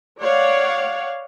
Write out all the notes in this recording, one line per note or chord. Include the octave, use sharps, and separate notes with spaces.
C#5 D5 F5 F#5